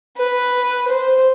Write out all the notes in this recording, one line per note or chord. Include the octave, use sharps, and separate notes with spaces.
B4
C5